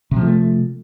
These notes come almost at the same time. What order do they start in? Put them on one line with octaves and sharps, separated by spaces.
C3 F3 G#3 A3